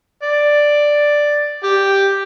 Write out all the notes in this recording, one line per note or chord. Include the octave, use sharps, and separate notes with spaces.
D5
G4